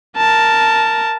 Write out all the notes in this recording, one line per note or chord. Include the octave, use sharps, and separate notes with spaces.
A#4 A5